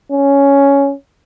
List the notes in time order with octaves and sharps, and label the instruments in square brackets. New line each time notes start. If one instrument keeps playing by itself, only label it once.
[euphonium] C#4